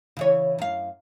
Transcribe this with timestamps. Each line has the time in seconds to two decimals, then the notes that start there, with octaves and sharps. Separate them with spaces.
0.17 C#3 E3 C#5
0.59 F#2 F5